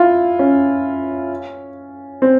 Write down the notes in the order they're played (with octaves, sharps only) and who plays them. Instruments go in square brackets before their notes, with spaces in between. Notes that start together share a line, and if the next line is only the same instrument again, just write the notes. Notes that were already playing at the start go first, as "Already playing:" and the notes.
Already playing: [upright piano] E4 F4
C#4
C4